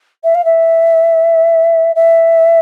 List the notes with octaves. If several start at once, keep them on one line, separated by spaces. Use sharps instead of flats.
E5
F5
E5
E5